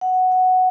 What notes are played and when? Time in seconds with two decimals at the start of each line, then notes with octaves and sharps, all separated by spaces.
0.01 F#5
0.32 F#5